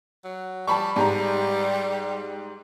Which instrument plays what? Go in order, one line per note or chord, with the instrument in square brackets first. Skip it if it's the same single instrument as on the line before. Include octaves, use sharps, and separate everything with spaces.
[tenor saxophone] F#3
[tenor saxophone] G3 [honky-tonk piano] A5 B5 C#6
[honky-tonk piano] G#2 G4 A#5 [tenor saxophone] G3